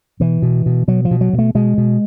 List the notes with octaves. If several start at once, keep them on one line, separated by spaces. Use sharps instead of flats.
B2 E3
B2
B2
B2 F#3
F3
B2
F#3
B2
A3
B2 G#3
B2